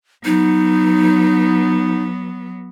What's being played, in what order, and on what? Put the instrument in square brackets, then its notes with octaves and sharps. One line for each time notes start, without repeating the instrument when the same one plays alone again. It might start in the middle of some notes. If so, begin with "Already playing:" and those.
[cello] F#3 B3 [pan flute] D#4